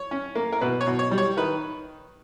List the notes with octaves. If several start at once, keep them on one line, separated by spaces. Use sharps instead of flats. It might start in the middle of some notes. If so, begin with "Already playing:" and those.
Already playing: C#5
C#4
A#3
A#4
B2 B4
C#5
B2
C#5
G3
C#5
D#3 B4